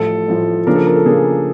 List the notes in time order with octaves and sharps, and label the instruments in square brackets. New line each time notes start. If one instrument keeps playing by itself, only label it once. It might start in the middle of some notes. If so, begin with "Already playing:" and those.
Already playing: [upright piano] A1 A2 F3 [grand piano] A4
[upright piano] A1 A2 F3
[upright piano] C#3 F3 A#3 D4 [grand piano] A#4
[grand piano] A4
A#4
A4
[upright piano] C#3 F3 A#3 D4 [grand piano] G#4